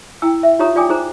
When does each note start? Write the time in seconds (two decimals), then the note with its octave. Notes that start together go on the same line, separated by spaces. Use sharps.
0.22 E4 G5 E6
0.43 E5
0.59 D#4 F4 G4 C#5 A#5 D#6
0.76 F4 D5 G5 G#5 D6 D#6
0.89 D#4 G#4 C5 A#5